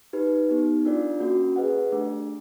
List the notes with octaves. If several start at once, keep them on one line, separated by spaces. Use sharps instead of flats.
D#4 G4 B4
B3 D#4 G4
D4 F4 A#4 D5
A#3 C#4 F#4 A#4
G#4 B4 D#5 F#5
A3 D4 G4